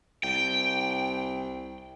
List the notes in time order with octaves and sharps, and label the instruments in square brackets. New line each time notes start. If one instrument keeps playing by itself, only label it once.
[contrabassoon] C2 [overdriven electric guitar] G5